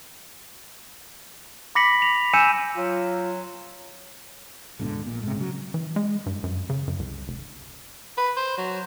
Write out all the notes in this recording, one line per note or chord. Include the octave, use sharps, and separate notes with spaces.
B5 D6 A#6 B6 C#7 F#7
F7
G#5 E6 G6 C#7 D#7 E7
F#3 F4
D1 G#2 B2 D3
A#1 A#2
G#2 C3
C#3 F#3
E3
G#3
G2
F#2
C#3
F#2
C2
F1
B4
C5
F#3